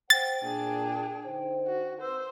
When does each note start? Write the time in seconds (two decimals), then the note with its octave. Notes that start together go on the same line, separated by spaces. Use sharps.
0.10 C5 F#5 G5 A6
0.42 A#2 D4 G#4
1.26 D3 D#4 C5
1.66 F#4
2.01 C4 B4 C5 E6